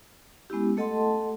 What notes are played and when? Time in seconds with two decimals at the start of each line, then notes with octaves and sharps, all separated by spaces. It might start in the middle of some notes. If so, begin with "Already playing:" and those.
0.50 G#3 B3 C#4 E4 G4
0.77 A3 A4 D#5 F#5 A5 C6